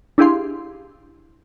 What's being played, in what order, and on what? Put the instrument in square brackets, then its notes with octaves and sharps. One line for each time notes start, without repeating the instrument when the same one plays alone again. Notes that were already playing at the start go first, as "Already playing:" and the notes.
[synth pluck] D4 E4 G4 G#4 F5 C6